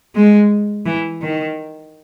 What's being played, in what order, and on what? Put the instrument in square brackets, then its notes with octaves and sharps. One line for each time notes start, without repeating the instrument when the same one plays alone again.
[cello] G#3
E3
D#3